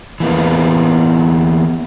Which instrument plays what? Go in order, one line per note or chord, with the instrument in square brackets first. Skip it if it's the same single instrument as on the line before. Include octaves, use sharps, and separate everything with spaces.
[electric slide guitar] E3 A#3 B3